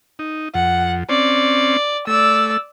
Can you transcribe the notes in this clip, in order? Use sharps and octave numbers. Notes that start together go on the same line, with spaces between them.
D#4
F2 F#5
C4 C#4 D5
A3 D5 E6